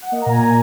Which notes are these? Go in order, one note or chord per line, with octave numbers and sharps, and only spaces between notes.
F#5
A#3 D#5
A#5
A#2
G#5